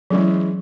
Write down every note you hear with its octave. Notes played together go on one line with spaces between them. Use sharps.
E3 F#3 G#3 C#4 G#4